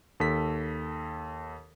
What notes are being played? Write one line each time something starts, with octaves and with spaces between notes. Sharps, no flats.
D#2 A4 B6